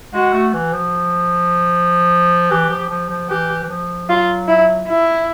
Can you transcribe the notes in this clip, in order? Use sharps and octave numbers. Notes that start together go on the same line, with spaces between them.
G#3 F#4
A3
E3
F3
E3 G4
F3
F3
F3
E3 G4
E3
F3
F#3 F4
E4
E4